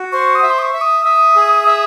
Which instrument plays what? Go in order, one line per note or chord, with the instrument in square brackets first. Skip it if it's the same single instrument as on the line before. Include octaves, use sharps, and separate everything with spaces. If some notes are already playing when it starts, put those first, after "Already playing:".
Already playing: [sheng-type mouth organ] F#4
[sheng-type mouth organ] C5 [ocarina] C#6
[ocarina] D#6
[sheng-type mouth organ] E5
[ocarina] C6
D#6
C#6
[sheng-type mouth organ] E5
[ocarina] D#6
[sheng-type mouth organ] E5
G#4
E5